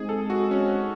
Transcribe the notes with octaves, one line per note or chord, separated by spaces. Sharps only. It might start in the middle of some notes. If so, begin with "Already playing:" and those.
Already playing: G#3 C4 D#4 G#4
A4
F#4
C#4